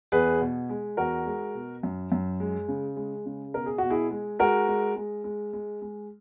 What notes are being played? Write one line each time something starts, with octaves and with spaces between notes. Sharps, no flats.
E2 G#4 B4
B2
G#3
E2 F#4 A#4
G#3
B2
F#2
F#2
G#3
C#3
G#3
C#3
B2 A#4
G#4
B2 F#4
E4 G#4
G#3
G#3 F#4 A#4
G#3
G#3
G#3
G#3
G#3